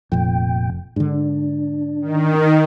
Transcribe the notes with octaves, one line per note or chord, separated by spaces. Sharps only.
F1 F2 A#2 G5
G#2 D3 D4
D#3